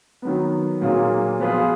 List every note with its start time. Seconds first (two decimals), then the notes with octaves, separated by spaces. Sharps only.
0.22 D#3 F#3 B3
0.81 A#2 F#3 A#3 F4 G#4
1.40 F3 B3 F4 G#4